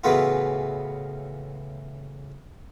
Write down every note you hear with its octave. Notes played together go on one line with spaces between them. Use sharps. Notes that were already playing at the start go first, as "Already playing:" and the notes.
A2 C#3 E3 B3 F4 F#4